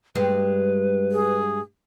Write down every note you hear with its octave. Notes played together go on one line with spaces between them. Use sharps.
G2 G3 G#3 B4
G#4